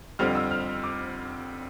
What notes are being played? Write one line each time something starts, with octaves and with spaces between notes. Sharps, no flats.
F2 D3 G3 C4 F6
E6
F6
D6